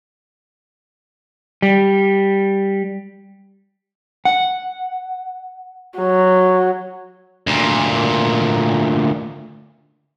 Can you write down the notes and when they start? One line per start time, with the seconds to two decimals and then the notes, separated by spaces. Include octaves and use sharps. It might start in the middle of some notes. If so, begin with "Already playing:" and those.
1.62 G3
4.25 F#5
5.97 F#3
7.47 D2 A#2